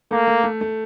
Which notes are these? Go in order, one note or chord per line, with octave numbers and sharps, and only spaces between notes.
A3 A#3
A3
A3
A3